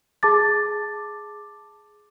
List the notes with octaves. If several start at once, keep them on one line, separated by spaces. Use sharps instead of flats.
G#4 A5 D6 A6